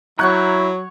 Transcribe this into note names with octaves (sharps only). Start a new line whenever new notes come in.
F#3 E4 C#5 F#5 A#5 C#6 F#6 G6